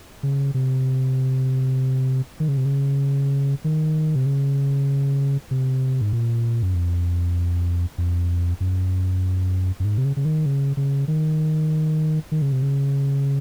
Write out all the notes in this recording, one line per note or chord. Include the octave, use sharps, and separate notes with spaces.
C#3
C3
D#3
C#3
C3
C#3
D#3
C3
C#3
C3
G#2
A#2
F#2
F2
F2
F#2
F#2
G#2
C3
C#3
C#3
D#3
C#3
C#3
D#3
D#3
C#3
C3
C#3